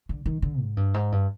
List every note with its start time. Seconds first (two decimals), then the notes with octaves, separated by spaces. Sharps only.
0.09 D3
0.26 D#3
0.42 D3
0.61 G#2
0.77 G2
0.94 G#2
1.12 G2